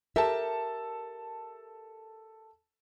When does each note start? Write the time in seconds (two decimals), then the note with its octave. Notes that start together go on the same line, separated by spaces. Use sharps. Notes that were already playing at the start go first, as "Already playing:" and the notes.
0.16 G4 A4 A#4 E5 A5